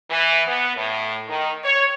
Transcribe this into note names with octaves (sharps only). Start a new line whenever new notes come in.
E3
B3
A2
D#3
C#5